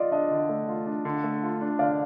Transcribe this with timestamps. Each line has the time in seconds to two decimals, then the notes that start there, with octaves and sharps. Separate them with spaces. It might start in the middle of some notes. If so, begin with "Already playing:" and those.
Already playing: F4 D5 D#5
0.12 D4 D#5
0.31 D3
0.49 A3
0.68 F4
0.86 D4
1.05 D3
1.24 A3
1.43 F4
1.61 D4
1.79 D3 D5 F5